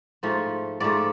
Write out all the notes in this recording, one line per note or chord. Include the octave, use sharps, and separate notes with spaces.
G#2 F3 A3
G#2 F3 A3 D5